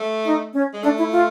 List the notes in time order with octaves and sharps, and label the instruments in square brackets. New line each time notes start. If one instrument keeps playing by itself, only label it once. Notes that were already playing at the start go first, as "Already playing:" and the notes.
Already playing: [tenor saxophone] A3
[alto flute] D#4
C#4
[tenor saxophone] G#3
[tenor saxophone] A3 [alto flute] D4
[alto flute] E4
F4